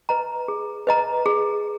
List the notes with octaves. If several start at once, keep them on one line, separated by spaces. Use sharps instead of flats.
B4 D#5 A#5
G#4
B4 D#5 A#5
G#4